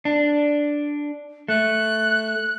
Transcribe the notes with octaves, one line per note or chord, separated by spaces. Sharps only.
D4
A3 F#6